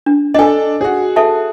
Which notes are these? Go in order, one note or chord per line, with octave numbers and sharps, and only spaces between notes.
D4
D4 A4 D#5 G#5
F#4 G#4
A4 E5 A5